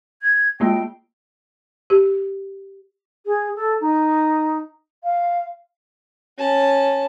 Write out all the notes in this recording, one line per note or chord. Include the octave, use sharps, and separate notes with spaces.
G#6
G#3 A#3 F4 G5
G4
G#4
A4
D#4
F5
C#4 A5